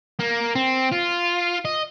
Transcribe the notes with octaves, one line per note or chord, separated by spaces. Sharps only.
A#3
C4
F4
D#5